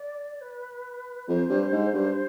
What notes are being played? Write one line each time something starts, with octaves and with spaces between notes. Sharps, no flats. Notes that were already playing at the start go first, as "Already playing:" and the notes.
Already playing: D5
B4
F2 C5
G2
G#2
G2